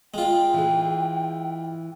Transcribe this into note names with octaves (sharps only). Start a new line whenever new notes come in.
G#3 F4 G5
E3 G#4